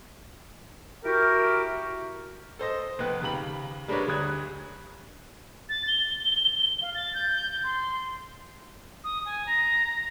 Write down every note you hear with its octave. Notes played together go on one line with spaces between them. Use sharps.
E4 F#4 G4 A#4
A4 C5 D#5
F1 B3 B4 G5 F#6
D#2 C#3 G4 A#5 B5 F#7
G3 G#3 D4 A#4 B4 C#5
D2 G3 D#6 F#6 G#6
A6
G7
F5
A6
G6
C6
D#6
G#5
A#5